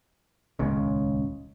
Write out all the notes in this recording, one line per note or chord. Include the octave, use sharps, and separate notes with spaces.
D#1 C#2 C#3